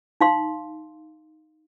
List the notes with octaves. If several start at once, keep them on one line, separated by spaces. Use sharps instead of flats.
D#4 F5 C6